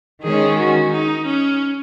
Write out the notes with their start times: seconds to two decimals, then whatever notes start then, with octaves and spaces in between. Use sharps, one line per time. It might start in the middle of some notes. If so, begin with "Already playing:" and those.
0.24 D#3 G#3 C#4 G#4
0.58 F#4
0.92 D#4
1.26 C#4